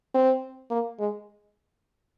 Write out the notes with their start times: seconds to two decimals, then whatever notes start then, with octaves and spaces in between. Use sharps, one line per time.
0.14 C4
0.71 A#3
0.99 G#3